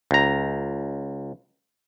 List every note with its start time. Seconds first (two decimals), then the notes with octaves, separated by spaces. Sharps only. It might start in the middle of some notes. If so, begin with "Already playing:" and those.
0.11 C#2 A#5